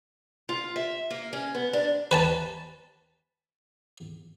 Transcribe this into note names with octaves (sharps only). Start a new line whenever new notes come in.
F4
E5
A#3
C#4
B3
D4
B4 G#5 A5